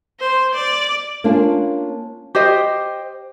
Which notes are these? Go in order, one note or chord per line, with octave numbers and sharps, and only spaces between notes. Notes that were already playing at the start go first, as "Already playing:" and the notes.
C5
D5
A#3 C#4 D4 F4
G4 C5 D#5